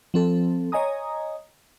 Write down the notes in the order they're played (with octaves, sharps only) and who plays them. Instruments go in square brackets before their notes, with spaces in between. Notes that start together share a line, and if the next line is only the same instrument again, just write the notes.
[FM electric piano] F3 C4 A4
C#5 D#5 G#5 A#5 D#6